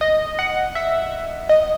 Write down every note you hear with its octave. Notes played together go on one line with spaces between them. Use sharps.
D#5
F#5
E5
D#5